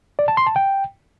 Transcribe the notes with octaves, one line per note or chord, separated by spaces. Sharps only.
D5
A5
C6
A5
G5